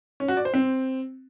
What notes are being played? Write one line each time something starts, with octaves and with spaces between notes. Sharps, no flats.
C#4
F#4
D5
C5
C4